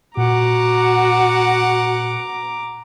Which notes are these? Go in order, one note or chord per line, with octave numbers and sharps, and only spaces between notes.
A#2 F#4 F#5 A#5 D6